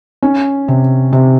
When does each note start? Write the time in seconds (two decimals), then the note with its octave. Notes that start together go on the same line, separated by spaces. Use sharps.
0.22 C#4
0.68 C3
1.13 C3